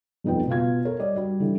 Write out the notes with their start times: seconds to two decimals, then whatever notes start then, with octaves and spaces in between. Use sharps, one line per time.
0.24 F1 B1 F3 D#4 B4 G5
0.48 B2 B3 F4 F5 G#6
0.85 A4 A#4 C#5
0.99 G3 D5 D#5
1.16 G3 F#4
1.40 D3 E3 G3